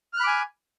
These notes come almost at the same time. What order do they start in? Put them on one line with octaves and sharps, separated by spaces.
F6 F#6 B5 D6 G#5